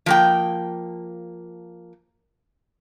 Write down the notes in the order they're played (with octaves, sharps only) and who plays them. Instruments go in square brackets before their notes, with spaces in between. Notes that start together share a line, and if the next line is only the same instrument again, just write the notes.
[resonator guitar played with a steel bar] F3 A#3 G5